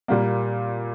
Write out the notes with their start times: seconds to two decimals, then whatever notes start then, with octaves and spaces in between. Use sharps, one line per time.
0.08 A#2 G3 A#3